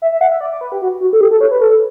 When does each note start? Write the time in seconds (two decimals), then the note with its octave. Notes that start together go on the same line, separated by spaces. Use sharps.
0.02 E5
0.12 E5
0.21 F#5
0.32 E5
0.41 D5
0.52 D5
0.61 B4
0.72 G4
0.82 F#4
1.01 F#4
1.13 A4
1.21 G4
1.31 A4
1.41 C#5
1.51 B4
1.61 A4